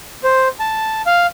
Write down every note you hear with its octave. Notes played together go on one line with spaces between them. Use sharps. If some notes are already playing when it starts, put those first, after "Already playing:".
C5
A5
F5